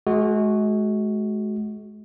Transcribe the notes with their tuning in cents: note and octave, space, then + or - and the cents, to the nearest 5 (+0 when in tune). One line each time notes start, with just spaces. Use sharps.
G#3 +40 F#4 +0